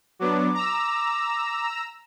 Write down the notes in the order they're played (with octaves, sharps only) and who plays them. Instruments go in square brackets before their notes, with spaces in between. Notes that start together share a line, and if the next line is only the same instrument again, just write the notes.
[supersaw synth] F#3 B3 D4 [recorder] D6
[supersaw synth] A#5 E6